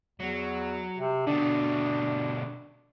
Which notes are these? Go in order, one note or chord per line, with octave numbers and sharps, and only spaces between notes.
E2 F#3
C3
B2 D3 D4